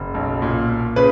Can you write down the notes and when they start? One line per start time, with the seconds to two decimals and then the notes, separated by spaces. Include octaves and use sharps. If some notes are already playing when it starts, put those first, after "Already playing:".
Already playing: F#1
0.14 B1
0.42 A#2
0.69 A#2
0.96 C#3 B4